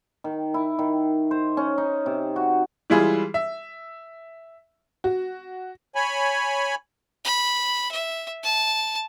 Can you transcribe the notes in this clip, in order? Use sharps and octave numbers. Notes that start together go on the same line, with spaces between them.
D#3
E4
D#3
C5
C#4
D#4
C3
F#4
E3 G3 G#3 E4 F4 G#4
E5
F#4
C#5 G#5 B5
B5
E5
A5